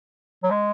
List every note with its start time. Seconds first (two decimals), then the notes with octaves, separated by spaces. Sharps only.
0.43 F#3
0.50 G#3